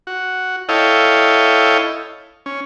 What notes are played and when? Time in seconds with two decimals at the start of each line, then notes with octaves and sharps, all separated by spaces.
0.07 F#4
0.69 E4 A4 C#5 D#5 F5 G5
2.46 C#4